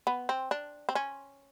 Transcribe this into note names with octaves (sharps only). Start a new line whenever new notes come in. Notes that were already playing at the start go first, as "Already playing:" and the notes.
B3
C4
D4
C4
C#4